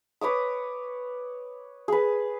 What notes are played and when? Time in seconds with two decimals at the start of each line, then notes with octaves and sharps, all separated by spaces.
0.21 B4 C#5 D6 D#6
1.88 G#4 B4